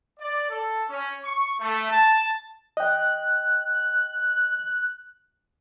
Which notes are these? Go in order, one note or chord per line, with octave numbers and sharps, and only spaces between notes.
D5
A4
C#4
C#6
A3
A5
D#5 G5 F#6